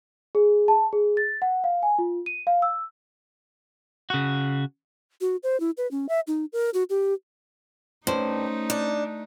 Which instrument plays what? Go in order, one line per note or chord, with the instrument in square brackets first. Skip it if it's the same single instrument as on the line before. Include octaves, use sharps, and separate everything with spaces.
[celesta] G#4
A5
G#4
A6
F#5
F5
G#5
F4
D#7
F5
E6
[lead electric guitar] C#3 F#4
[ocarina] F#4
C5
E4
B4
C#4
E5
D#4
A#4
F#4
G4
[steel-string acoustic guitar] G2 [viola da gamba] A3 D#4 [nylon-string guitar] C#4 C5
[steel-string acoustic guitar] D4